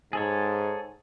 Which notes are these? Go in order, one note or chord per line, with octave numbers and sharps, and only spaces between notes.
G#2 G#4 A4 C#5